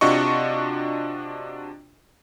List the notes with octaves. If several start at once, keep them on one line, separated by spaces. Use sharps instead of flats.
C3 D4 F4 F#4 D#5 C#6